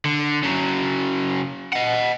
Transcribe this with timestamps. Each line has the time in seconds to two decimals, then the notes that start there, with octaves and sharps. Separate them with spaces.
0.05 D3
0.43 C#3 F#3
1.73 D#5 F#5